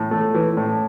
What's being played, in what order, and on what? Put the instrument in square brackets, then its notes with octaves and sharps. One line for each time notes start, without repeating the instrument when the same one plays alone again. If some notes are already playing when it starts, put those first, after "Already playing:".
Already playing: [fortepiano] A2
A3
E3
A2